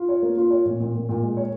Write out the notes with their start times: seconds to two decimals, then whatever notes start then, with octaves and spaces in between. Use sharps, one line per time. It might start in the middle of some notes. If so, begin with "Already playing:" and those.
Already playing: F4
0.09 C#5
0.22 A#3
0.37 F4
0.51 C#5
0.65 A#2
0.80 A#2
0.94 A#2
1.09 A#2
1.23 G#3
1.37 C#5